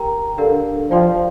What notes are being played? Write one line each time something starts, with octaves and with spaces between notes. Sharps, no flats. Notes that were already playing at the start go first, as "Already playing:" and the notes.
Already playing: G4 A#4 G5 A#5
D3 D4 G4 A#4 F5
F3 F4 D5 G5 C6